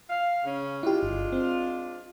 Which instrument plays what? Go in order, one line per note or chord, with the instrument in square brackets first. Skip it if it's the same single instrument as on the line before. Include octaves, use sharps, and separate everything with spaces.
[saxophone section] F5
C#3 C#4
[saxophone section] G#3 D4 F4 [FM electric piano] E4 G4
[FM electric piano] G1
C4